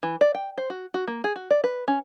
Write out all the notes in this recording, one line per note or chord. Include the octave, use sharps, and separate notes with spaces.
E3
D5
G5
C5
F#4
F#4
A#3
G#4
F#4
D5
B4
C#4